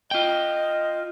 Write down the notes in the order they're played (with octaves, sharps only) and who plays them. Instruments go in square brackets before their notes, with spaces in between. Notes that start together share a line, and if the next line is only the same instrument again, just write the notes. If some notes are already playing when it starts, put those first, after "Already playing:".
[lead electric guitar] F4 G5 [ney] D#5